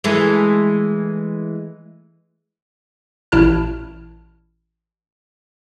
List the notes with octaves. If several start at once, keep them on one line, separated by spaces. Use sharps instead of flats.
E3 G#3 A3
A1 A#2 E4 A5 F6